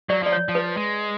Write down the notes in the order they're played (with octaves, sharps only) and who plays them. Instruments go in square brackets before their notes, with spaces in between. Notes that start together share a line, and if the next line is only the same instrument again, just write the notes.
[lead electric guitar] F#3 [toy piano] D5
[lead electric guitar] F3 [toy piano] D5
[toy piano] C#5
[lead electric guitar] F3
[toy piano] B4
[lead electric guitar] G#3